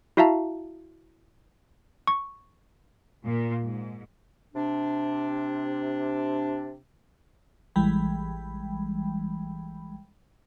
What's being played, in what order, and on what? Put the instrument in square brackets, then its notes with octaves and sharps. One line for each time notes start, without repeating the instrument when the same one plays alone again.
[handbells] E4 F#4 E5 F5 A5 A#5
C#6
[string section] A#2
G#2
[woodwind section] C3 D4
[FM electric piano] A1 E3 G3 G#3 G5 B5